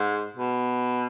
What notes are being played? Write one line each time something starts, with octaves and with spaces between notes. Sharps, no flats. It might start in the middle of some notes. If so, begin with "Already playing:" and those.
Already playing: G#2
B2